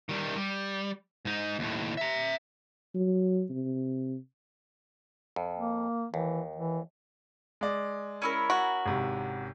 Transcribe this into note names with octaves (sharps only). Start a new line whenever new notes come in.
D#3 G3
G3
G#2 D#4
D#2 A2
E5 A#5
F#3
C3
F2
A#3
D#2 E3
E3
G#3 D5
C#4 E4 A#4
F#4
G#1 C3